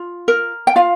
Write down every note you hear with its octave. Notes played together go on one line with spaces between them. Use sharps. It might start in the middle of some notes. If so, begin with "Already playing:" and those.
Already playing: F4
A#4
G5
F4 F5